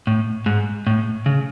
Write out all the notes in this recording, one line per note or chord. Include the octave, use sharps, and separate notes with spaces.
A2
G#2
A2
C#3